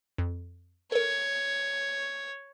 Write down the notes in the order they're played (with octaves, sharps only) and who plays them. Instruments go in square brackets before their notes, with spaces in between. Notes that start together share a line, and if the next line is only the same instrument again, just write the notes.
[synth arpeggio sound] F2
[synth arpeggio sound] A4 A#4 [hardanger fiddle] C#5